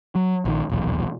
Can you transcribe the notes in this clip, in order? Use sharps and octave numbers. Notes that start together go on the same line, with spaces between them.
F#3
A#1 D#3
D#1 B1 E2